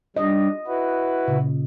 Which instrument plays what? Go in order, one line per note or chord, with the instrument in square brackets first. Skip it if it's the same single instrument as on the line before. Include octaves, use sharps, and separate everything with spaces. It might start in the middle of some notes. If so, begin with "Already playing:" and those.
[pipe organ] G3 D4 [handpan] D#5
[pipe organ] E4 F#4 B4
[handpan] A#2 C#3